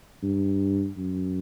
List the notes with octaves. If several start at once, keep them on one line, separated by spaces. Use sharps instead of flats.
G2
F#2